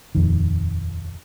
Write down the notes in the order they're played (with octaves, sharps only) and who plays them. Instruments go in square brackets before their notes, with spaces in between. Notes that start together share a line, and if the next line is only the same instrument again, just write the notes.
[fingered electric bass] D#1 F2 D#3